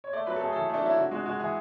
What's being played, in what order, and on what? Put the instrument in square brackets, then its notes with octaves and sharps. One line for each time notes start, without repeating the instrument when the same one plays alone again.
[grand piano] C#5
A3 D5
F#3 B4
A4
A3 G#4
E3 A4
A3 D4
F#3 E4
D3 F#4
G#3 F#4
G#3 F#4
E3 G#4